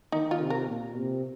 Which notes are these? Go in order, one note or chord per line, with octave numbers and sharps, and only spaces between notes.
D#3 D#4
F4
C3
A#4
A#2
C3